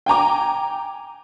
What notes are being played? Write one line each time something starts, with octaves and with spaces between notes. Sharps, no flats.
G5 G#5 A#5 D6